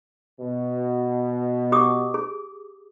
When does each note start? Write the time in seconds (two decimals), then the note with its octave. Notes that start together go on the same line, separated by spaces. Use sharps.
0.41 B2
1.72 G4 D6 D#6
2.14 G#4